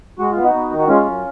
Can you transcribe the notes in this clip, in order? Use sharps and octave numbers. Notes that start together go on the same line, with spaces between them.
G#3 F#4
B3 F4
D#4 F#4
B3
D#3
F#4
G#3 C#4 F4
F#2